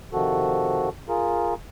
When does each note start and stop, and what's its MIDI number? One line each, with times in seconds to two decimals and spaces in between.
0.13 0.89 48
0.13 0.89 51
0.13 0.89 53
0.13 0.89 66
0.13 0.89 69
1.08 1.54 65
1.08 1.54 68
1.08 1.54 70